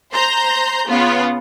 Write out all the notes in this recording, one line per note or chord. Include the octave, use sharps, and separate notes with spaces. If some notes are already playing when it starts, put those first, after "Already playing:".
C5 A#5 C6 G6
C#3 B3 F4